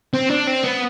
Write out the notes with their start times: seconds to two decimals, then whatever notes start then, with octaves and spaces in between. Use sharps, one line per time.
0.14 C4
0.30 D4
0.47 C4
0.64 B3